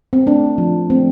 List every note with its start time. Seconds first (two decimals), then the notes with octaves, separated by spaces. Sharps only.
0.13 C4
0.26 A3 D4
0.58 F3
0.90 A3 C4